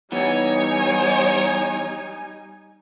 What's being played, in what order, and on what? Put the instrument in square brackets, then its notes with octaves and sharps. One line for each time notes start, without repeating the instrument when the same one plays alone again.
[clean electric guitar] E3 B3 [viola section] G3 D#4 G#5 [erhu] C#5